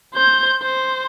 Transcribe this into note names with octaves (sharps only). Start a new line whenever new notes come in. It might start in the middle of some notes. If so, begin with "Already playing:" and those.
C5 G6
C5